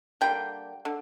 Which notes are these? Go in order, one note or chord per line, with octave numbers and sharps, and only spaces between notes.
D3 G3 A#3 G5
D3